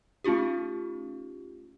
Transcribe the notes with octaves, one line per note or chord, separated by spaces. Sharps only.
A3 C#4 D#4 F4 G4